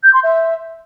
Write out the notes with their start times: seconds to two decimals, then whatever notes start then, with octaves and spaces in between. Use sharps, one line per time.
0.03 G6
0.13 C6
0.23 E5